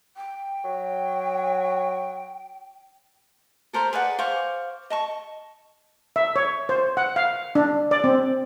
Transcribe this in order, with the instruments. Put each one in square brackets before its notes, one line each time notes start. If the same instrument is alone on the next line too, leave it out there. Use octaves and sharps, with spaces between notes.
[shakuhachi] G5
[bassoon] F#3
[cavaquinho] A4 A#4 C5 B5
G#4 B4 D5 F#5
C5 F5 C#6 D6
D#5 A5 C#6
[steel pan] E5
C#5
C5
F#5
F5
D4
D5
C4